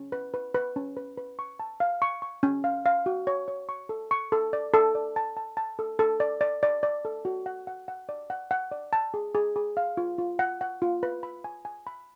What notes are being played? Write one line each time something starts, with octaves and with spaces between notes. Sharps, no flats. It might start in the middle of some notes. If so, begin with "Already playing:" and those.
Already playing: C#4
B4
B4
B4
C#4
B4
B4
C#6
A5
F5
C#6
C#6
C#4
F5
F5
F#4
C#5
C#5
C#6
A4
C#6
A4
D5
A4
D5
A5
A5
A5
A4
A4
D5
D5
D5
D5
A4
F#4
F#5
F#5
F#5
D5
F#5
F#5
D5
A5
G#4
G#4
G#4
F5
F4
F4
F#5
F#5
F4
B4
B5
G#5
G#5
B5